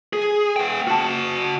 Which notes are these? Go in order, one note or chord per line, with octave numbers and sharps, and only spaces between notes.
G#4
B3 G5
F#4 A5